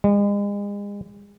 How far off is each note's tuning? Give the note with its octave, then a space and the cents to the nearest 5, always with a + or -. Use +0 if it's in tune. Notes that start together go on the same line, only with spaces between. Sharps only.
G#3 -40